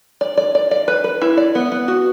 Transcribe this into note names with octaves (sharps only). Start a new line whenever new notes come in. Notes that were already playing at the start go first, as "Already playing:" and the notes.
D5
D5
D5
D5
B4
B4
E4
D5
B3
B3
F#4